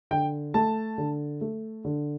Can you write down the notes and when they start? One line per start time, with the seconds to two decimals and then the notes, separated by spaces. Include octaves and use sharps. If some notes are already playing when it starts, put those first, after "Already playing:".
0.11 D3 G5
0.54 A3 A5
0.98 D3
1.41 A3
1.85 D3